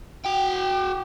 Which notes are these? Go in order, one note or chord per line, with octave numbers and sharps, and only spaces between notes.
F#4 G5